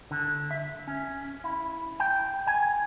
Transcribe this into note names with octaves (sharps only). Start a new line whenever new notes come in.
D3
E5
C#4
E4
G5
G#5